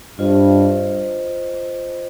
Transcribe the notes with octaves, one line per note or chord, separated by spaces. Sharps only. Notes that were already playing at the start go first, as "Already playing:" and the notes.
G2 F4 C5 D#5